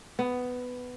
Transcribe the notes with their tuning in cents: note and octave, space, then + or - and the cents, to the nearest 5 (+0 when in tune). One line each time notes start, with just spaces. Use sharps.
B3 +10